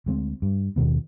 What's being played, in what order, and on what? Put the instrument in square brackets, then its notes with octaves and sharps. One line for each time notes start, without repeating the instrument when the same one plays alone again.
[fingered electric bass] D2 G#3 A3 C4
G2
D#2 B2 D#3 B3